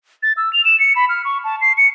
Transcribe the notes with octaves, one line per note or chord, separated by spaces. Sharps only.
A6
E6
F7
E7
C#7
B5
F6
C#6
A5
C7
C#7